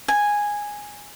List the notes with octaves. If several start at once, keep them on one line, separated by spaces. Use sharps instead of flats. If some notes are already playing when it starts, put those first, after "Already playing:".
G#5